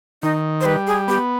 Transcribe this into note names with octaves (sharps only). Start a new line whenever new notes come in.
D#3 D#4
C5
G3 B4
G#4
B3 G4